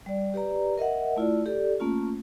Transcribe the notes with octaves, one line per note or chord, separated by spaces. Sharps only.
G3 D5
G4 B4 D5 A#5
A#4 D#5 E5 F#5
A3 E4 F4 D5
G4 A4 D5
A3 A#3 C#4 F4